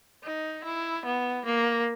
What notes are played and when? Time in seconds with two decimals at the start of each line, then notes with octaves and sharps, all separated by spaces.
0.24 D#4
0.64 E4
1.06 B3
1.46 A#3